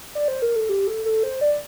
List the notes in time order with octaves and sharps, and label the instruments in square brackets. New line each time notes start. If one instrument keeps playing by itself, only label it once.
[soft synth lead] D5
C5
A#4
A4
G4
A4
A4
C5
D5